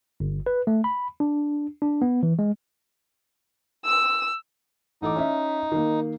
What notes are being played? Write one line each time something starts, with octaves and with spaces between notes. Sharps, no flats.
G1
B4
A3
B5
D4
D4
B3
E3
G#3
E6
A1 D#4 A4 D6
C#4 E5
D#3 A#3